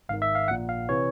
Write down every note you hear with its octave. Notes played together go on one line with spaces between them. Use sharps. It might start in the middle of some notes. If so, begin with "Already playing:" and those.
G#1 G#2 D#3 F5
E5
F5
A#1 A#2 F#5
F5
C3 E3 C#5